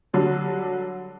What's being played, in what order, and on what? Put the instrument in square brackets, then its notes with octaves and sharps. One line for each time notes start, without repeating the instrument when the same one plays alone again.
[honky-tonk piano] D3 F#3 G3